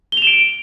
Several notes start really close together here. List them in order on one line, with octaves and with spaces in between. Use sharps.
G7 F7 E7 D7